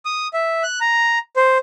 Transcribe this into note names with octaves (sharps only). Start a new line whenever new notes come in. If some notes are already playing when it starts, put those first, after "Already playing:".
D#6
E5
F#6
A#5
C5